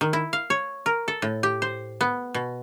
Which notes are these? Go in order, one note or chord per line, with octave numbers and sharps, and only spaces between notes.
D#3
E4
F5
C#5
A#4
A4
A2
G4
C5
B3
B2